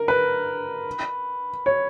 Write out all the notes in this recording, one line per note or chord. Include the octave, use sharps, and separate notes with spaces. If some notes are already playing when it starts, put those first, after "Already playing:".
Already playing: A#4
B4
C#5